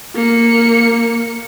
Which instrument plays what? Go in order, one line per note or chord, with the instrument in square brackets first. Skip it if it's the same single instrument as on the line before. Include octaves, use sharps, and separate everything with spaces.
[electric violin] A#3 C#7